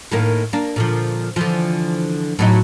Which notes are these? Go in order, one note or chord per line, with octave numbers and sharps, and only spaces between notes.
A2 D#3 A#3
A#3 D4
A#2 D3 F3
D3 E3 F3
A2 F#3 D#4